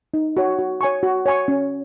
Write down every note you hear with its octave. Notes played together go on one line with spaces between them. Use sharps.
D#4
F#4 C#5
F#4
C#5 G#5 C#6
F#4
C#5 G#5 C#6
C#4